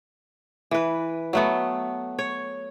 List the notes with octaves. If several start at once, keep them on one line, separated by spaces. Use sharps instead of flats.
E3 B4
F#3 A3 B3
C#5